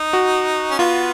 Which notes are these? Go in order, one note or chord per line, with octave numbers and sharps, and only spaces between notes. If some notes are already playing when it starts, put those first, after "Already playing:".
Already playing: D#4
F#4
C#4
B3 F4